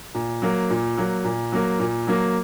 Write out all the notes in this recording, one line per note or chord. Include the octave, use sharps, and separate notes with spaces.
A#2
F#3 A#3
A#2
F#3 A#3
A#2
F#3 A#3
A#2
F#3 A#3